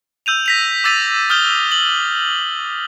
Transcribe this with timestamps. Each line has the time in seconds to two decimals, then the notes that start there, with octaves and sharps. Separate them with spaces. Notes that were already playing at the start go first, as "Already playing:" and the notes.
0.26 E6 G6 D#7 F7
0.46 A#6 B6 F7
0.84 D6 E6 A6 B6 D#7 F7
1.30 D#6 F6 G6 G7
1.72 F#7